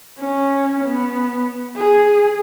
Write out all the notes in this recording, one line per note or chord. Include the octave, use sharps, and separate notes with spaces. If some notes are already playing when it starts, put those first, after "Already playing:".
C#4
B3
G#4